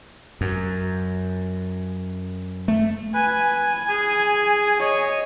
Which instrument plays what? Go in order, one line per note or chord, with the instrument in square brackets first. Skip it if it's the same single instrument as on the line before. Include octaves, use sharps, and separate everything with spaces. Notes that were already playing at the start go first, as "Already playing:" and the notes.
[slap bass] F#2
A3
[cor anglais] B4 [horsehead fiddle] G#5
[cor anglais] G#4
[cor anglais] C#5 [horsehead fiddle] D#5